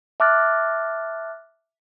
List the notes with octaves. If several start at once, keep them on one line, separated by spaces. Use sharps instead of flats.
E5 A5 D6 F6 F#6 A6